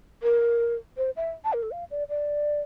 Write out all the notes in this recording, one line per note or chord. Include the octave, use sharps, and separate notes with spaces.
A#4
C5
E5
A5
A#4
A4
F5
D5
D5